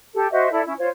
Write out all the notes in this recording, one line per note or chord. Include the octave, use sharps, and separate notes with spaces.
G4 A4
F#4 C5 D#5 E5
E4 A4 D5
C#4 E4
F4 C5 C#5